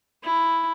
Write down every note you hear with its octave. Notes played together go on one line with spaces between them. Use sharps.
E4